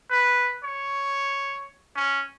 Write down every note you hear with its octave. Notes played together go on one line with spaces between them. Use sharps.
B4
C#5
C#4